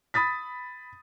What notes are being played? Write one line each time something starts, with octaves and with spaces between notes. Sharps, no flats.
B5 D#6 A6 B6